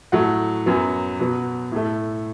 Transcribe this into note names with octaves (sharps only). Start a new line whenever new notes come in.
A2 F#3 A3 F#5
F#2 F#3 B3
B2 F#3 B3
A2 A3